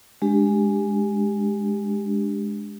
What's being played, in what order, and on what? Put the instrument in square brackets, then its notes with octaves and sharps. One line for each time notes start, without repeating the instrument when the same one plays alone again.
[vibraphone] G#3 D4 G4